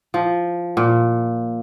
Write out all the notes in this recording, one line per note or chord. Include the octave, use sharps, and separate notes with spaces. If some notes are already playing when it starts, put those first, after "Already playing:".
F3
A#2